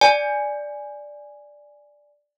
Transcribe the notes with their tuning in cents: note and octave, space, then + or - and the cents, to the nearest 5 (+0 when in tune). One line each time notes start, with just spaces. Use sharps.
D5 +0 G#5 +0